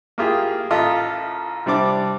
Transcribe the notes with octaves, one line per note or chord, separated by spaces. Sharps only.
A#3 E4 F4 G4 G#4
A1 F4 A4 D#5 E5
C3 G3 C4 D4 D6